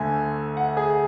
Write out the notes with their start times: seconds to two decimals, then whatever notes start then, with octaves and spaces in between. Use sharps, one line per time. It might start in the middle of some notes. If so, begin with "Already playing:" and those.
Already playing: D2 D3 A3 G#5
0.57 F#5
0.77 G#4